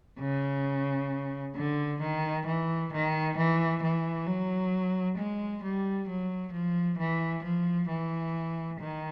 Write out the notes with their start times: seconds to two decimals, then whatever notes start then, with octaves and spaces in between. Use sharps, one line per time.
0.20 C#3
1.56 D3
2.00 D#3
2.46 E3
2.92 D#3
3.37 E3
3.82 E3
4.26 F#3
5.17 G#3
5.63 G3
6.08 F#3
6.53 F3
6.98 E3
7.43 F3
7.89 E3
8.80 D#3